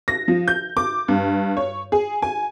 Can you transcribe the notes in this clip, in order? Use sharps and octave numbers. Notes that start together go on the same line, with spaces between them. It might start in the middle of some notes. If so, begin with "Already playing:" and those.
A#6
F3
G6
D6
G2
C#5
G#4
G#5